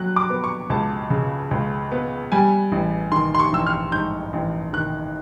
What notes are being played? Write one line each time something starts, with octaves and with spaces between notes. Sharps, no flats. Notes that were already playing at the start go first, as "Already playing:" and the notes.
Already playing: F#3 F#6
D6
B3
C#6
C#2 A5
C#3
C#2
B3
G3 G#5
A1
D#3 C6
C6
C#6
A1 E6
F6
G#2 G6
A1
D#3 F#6